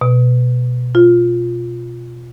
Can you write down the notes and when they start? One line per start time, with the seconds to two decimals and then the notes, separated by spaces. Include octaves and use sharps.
0.01 B2
0.95 F4